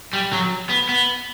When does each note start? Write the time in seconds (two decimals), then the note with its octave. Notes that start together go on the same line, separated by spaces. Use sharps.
0.13 G3
0.33 F#3
0.70 B3
0.89 B3